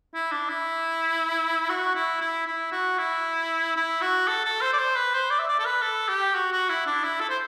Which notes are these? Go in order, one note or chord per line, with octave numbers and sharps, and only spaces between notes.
E4
D4
E4
F#4
E4
E4
E4
F#4
E4
E4
F#4
A4
A4
C5
D5
C5
B4
C5
D5
E5
D5
A4
B4
A4
G4
F#4
F#4
E4
D4
E4
A4
C5